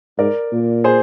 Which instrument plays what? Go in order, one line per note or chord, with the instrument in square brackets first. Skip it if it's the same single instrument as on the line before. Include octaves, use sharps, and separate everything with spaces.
[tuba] G#2 [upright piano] A#4 D5
[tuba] A#2
[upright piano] G#4 C5